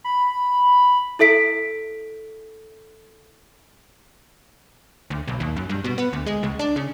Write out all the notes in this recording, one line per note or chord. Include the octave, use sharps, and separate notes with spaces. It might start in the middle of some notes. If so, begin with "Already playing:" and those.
B5
E4 A4 E5 B6 D7
D2
B1
D#2
F#2
G2
B2
B3
D2
G#3
C#2
D4
C#3